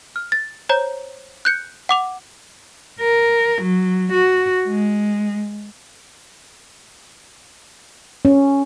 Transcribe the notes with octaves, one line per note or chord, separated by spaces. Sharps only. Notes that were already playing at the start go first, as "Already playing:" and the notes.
F6
A6
C5 C#5 A#5 G6
F#6 G6 C#7
F#5 D6 F7
A#4
F#3
F#4
G#3
C#4